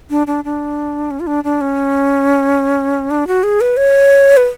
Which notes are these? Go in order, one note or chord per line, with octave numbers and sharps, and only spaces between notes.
D4
D4
D4
C#4
F4
D4
D4
C#4
D4
F#4
G#4
B4
C#5
B4